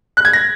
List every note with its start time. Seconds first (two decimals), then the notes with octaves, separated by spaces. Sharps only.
0.17 F#6
0.25 G#6
0.33 A#6